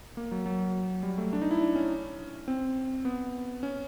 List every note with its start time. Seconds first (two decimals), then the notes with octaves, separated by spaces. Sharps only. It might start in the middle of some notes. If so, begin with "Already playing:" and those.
0.17 A#3
0.31 F#3
0.46 F#3
1.03 G3
1.18 A3
1.33 D4
1.42 D#4
1.51 E4
1.61 D4
1.75 C#4
2.48 C4
3.05 B3
3.63 C#4